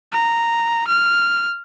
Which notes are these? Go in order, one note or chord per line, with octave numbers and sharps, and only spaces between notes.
A#5
F6